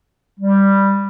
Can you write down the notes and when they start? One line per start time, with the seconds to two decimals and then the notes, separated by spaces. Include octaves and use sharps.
0.40 G3